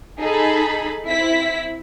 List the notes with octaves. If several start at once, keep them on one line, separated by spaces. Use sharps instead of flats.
D#4 G#4 A4 B5
C4 E4 B6